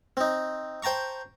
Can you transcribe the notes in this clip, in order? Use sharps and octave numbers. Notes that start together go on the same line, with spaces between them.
C4 D#4
C5 G5 A5 A#5 C#6